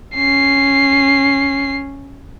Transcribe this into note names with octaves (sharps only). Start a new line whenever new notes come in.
C#4 C7